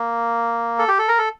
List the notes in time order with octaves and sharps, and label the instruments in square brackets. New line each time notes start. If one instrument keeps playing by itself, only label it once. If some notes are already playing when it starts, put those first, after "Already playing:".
Already playing: [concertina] A#3
A4
G4
A4
A#4
A4